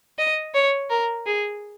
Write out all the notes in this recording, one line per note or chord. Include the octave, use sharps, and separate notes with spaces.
D#5
C#5
A#4
G#4